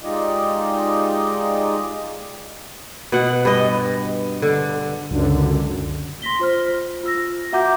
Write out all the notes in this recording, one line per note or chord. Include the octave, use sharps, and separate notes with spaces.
G#3 D#4 F4 G4 D5 D#5
B2 F#5
G2 D#5
D3
C#2 F#2 D3
C6 A#6 B6 G7
F4 C5 F6
F4 E6 A#6
F#4 E5 F#5 A#5 D6 G6